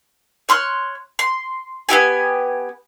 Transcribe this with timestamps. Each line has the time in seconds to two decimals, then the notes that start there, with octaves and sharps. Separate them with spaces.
0.49 C#5 C6 F6 F#6
1.19 C6
1.89 B3 E4 G4 G#5